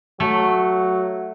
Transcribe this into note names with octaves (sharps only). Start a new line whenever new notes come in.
F#3 A3